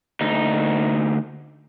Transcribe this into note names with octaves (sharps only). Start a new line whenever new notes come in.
D2 D#4